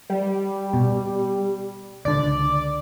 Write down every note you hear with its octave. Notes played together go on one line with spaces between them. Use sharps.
G3
B2
C#2 D3 D5